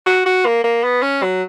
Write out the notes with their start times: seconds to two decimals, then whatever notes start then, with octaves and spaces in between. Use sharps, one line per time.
0.06 F#4
0.26 F#4
0.46 A#3
0.64 A#3
0.84 B3
1.02 C#4
1.23 F#3